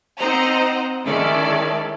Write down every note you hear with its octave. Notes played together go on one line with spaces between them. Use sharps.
C4 D#4 C5 D#5 F#5 A#5
D#3 G#3 C#4 E4 A4 D5